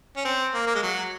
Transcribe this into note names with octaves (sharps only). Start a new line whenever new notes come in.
C#4
C4
A#3
A#3
G#3
F#3